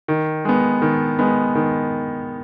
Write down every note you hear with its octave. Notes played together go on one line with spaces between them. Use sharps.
D#3
G#3 B3
D#3
G#3 B3
D#3